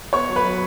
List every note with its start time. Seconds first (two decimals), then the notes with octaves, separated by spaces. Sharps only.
0.13 B3 C#5 C#6
0.29 F#3
0.36 B4 B5
0.45 F#3